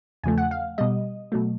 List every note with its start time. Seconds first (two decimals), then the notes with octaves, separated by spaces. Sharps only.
0.23 E2 C#3 F3 A3 G#5
0.38 F#5
0.51 F5
0.78 B2 G3 D#5
1.32 B2 F#3 A3